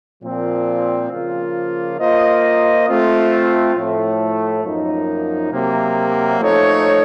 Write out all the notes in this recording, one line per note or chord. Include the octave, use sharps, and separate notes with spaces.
A#2 F3 C4
C#3 F3 A#3 F4
A#3 F4 C5 D#5
A3 C4 F4
A2 F3 A3
F#2 F3 A#3 D#4
C3 F#3 A#3
F3 A3 D#4 A4 C#5